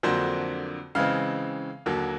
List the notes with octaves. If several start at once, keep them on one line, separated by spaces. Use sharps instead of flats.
F2 D3 F#3 A#3 D4 C5
C#3 E3 G#3 C4 F5
D#2 D3 F#3 A#3